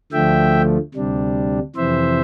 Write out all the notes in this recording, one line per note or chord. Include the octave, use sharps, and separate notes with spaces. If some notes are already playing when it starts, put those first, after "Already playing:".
D2 D3 F3 A3 E5 G5
D2 C3 G3 D4
F2 C3 E3 C5 E5